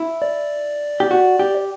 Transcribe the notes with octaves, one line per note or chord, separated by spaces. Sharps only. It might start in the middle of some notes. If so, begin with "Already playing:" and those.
Already playing: E4
D5
G4
F#4
G4